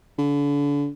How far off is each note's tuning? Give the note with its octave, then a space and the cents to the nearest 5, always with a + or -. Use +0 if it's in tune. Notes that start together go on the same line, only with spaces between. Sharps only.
D3 -35